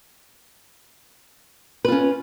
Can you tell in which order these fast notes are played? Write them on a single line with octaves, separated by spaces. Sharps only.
B4 F4 C#4